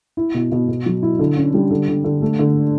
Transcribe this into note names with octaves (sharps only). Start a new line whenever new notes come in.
E4
B2
B2
B2
F#3
E4
D3
C#4
G3
D3
D3
D3
A3
D3